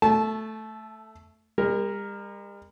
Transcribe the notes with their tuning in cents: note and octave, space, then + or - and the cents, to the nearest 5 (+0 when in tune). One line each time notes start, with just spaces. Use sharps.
A3 +0 A5 -25
G3 +45 A#4 +0